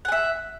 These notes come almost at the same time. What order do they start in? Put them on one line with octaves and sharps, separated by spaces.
F#5 G#5 E5